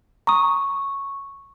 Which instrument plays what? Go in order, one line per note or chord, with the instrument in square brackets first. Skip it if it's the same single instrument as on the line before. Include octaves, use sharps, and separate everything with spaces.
[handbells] A#5 D#6 [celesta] C#6